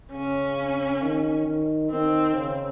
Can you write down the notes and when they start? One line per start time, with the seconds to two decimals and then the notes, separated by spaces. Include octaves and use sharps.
0.12 C#3 C#4
1.01 D#3
1.47 D#3
1.91 D#3 C4
2.36 C#3